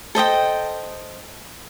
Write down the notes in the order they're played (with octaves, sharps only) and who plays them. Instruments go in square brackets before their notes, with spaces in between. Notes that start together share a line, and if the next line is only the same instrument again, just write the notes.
[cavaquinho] A4 C5 D#5 G5